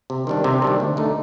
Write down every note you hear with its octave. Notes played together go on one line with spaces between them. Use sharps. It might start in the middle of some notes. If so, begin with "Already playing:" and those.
C3
D#3 G3 D4
C3
D#3 G3 D4
D2
D3 A3 D#4